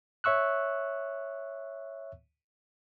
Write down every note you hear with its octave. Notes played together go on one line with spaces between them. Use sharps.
C#5 E5 C#6 E6 F#6